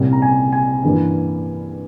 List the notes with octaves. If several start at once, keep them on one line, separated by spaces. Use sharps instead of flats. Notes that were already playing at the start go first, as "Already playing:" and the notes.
Already playing: C2 A#2 G3 C#4
A#5
G#5
G#5
G2 E3 A#3 C#4